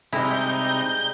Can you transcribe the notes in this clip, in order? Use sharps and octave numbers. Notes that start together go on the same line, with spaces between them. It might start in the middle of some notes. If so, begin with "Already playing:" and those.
C3 G3 G#3 D#4 E4 A#5 G6